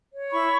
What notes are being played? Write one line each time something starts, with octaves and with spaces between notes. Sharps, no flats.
C#5
E4 B5 C#6